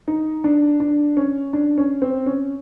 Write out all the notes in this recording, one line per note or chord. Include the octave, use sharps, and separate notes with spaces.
D#4
D4
D4
C#4
D4
C#4
C4
C#4